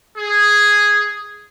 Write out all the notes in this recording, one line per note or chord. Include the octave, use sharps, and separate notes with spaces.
G#4